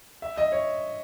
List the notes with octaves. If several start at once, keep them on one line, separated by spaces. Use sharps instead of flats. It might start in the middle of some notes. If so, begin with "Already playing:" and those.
E5
D#5
C#5